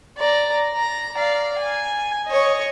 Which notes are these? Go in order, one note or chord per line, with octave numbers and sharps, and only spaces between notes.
D5 A#5
A#5
D5 F5
G#5
C#5 D#5